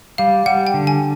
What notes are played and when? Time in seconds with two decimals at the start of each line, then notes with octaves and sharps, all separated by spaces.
0.18 G3 F5
0.46 G3 F#5
0.67 G5
0.74 D3
0.87 G#5